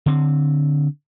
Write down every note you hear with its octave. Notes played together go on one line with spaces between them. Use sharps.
D3 C4